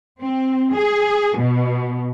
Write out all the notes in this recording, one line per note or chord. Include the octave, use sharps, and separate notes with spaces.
C4
G#4
B2